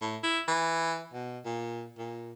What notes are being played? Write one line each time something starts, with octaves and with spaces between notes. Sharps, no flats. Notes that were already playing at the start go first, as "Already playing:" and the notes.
A2
E4
E3
B2
A#2
A#2